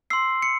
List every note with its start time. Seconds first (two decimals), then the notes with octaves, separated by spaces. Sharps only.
0.10 C6 E6 C7
0.42 C#7